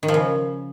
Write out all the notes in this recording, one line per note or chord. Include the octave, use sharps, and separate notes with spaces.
D#3
F3
C#3